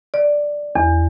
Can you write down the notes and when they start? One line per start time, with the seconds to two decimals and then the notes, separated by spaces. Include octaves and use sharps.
0.14 D5
0.76 E2